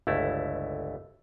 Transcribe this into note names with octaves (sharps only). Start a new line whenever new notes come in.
G1 C#2 A3 E4